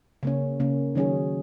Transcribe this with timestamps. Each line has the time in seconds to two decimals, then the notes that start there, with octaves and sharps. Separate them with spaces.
0.23 C#3 A#3 C#4
0.60 C#3 A#3 C#4
0.95 D#3 F#3 C#4 G#4